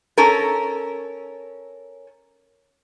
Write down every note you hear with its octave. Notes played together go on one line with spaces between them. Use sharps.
C#4 A4 A#4